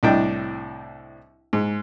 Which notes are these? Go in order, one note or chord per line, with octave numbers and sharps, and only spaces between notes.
C2 A2 D4 D#5 G5
G#2